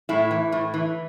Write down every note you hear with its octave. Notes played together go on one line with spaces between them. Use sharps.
A2 E4
E3
A2
E3